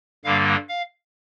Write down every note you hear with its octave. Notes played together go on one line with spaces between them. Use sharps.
G2 D3 G3 A#3 F5
F5